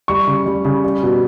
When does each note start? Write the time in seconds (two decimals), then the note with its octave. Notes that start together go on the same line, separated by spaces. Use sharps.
0.08 G3 C#6
0.27 C#3
0.46 G3
0.65 C#3
0.84 G3
1.03 B2